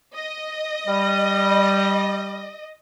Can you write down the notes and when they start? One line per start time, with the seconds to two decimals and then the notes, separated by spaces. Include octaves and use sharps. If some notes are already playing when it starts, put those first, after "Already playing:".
0.14 D#5
0.87 G3